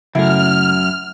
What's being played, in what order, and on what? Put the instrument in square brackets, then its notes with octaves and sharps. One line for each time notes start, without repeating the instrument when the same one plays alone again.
[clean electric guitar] F#2 [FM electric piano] C#3 A3 [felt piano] E4 [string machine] F6